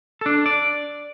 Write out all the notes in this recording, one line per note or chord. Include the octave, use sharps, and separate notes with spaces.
D4 A4
D5